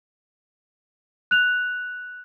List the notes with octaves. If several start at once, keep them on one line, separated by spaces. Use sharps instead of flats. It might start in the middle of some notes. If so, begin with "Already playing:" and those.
F#6 F7